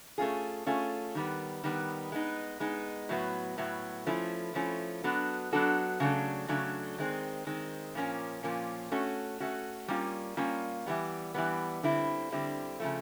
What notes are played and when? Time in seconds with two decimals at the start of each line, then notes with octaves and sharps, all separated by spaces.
0.18 A3 C#4 F4 G#4
0.66 A3 C#4 F4 G#4
1.15 D#3 G3 B3
1.64 D#3 G3 B3
2.12 G#3 B3 D#4
2.60 G#3 B3 D#4
3.09 A2 F#3 B3
3.58 A2 F#3 B3
4.07 F3 A3 C#4 E4
4.54 F3 A3 C#4 E4
5.04 F#3 B3 D4 F#4 A4
5.52 F#3 B3 D4 F#4 A4
6.00 C#3 F#3 A3 D4
6.48 C#3 F#3 A3 D4
6.98 D#3 G#3 C4
7.47 D#3 G#3 C4
7.95 A#2 F3 A#3 C#4
8.43 A#2 F3 A#3 C#4
8.92 A3 C#4 F#4
9.40 A3 C#4 F#4
9.88 G3 A#3 C#4 F4
10.37 G3 A#3 C#4 F4
10.86 E3 G3 B3
11.34 E3 G3 B3
11.83 D3 G3 C4 E4
12.31 D3 G3 C4 E4
12.80 C#3 F3 A3